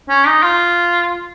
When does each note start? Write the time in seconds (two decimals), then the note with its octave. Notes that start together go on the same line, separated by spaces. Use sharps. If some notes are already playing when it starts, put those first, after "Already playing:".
0.09 C#4
0.27 D#4
0.43 F4